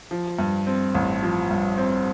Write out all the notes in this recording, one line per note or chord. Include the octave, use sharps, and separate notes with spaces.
F3
G2
C4
A1
F3
G2
C4